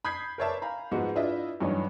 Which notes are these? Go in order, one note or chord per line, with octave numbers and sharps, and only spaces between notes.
B5 D#6 G6 G#6 B6 C7
A#4 B4 C#5 D5 E5 A5
F5 G#5 A#5 B5
G#2 F3 B3 D#4 F#4
D4 E4 F4 B4 D#5 E5
G2 E3 F#3 C#4 D#4